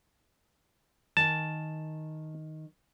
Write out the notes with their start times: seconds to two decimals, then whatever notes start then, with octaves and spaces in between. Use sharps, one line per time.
1.17 D#3 G#5 A5